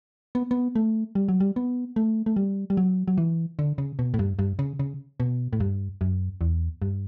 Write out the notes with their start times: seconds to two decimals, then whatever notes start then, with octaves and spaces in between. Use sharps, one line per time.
0.35 B3
0.51 B3
0.75 A3
1.15 G3
1.29 F#3
1.40 G3
1.56 B3
1.96 A3
2.26 A3
2.36 G3
2.70 G3
2.77 F#3
3.08 F#3
3.18 E3
3.59 D3
3.78 C#3
3.99 B2
4.14 A2
4.19 G2
4.39 G2
4.59 C#3
4.79 C#3
5.20 B2
5.53 A2
5.60 G2
6.01 F#2
6.41 E2
6.82 G2